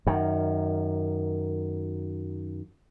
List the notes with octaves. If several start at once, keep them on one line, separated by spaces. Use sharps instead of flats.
F#2 D#3